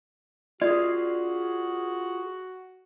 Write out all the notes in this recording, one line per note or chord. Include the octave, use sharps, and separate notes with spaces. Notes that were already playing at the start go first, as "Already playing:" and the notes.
F4 F#4 G#4 D5